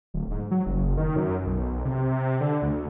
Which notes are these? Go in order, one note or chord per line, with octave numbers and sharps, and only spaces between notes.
D1
G#2
F#3
F#1
D#3
F#2
B1
C3
D3
D2